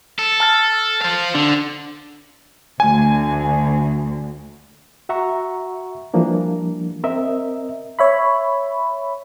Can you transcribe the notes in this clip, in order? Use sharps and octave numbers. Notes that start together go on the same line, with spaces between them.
A4
A5 F6 A6
C5 F5
D3 D4
D2 G#5
F#4 E5 F#5 A#5 C#6
E3 F3 G3 A#3 D4
C4 A#4 D#5 E5
C#5 E5 B5